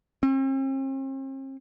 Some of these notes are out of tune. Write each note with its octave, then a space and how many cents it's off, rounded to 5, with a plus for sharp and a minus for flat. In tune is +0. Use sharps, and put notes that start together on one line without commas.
C4 +45